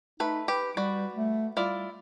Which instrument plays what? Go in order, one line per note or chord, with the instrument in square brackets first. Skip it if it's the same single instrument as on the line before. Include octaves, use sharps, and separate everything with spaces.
[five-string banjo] A3 B4 [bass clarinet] D#4
[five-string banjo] G4 [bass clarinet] B4
[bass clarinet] G3 [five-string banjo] F#4 B4 D5
[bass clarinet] A3
[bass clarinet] G3 [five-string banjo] E4 F4 D5